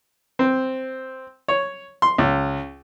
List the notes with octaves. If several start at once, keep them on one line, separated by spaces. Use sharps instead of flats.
C4
C#5
C6
C#2